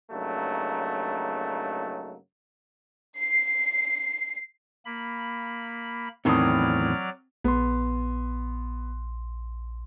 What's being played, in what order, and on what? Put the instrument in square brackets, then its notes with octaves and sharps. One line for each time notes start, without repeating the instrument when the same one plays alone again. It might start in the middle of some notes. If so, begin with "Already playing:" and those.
[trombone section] G2 C#3 F#3 A3 A#3 D#4
[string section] C7
[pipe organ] A#3 B5
[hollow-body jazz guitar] E2 A2 D#3 [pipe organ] F#3 D5 F6 [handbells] C4 D#6
[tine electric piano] A#1 C6 [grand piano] B3